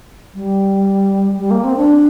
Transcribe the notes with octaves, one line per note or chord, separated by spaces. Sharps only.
G3
G3
A#3
C4
D4